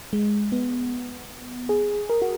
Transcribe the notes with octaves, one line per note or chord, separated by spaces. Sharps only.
G#3
B3
G#4
A#4
F#4